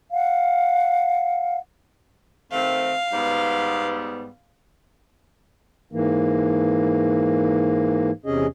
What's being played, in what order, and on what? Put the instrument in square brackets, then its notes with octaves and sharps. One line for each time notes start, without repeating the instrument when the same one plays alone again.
[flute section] F5 F#5
[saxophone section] D#3 A3 C4 [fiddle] F5
[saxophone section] G#2 G3 B3
[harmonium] G#2 E3 A#3
E2 C3 C#4 G#4 D#5